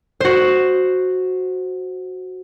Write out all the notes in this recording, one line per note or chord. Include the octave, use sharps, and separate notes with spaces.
F#4 C5